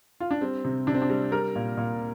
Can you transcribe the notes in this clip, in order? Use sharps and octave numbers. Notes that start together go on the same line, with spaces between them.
F4
D4
G3 C4
C3
C3 D4
C4
D4
G3
G3 A#4
A#2
A#2